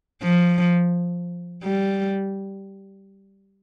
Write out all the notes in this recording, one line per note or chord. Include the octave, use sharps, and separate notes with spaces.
F3
G3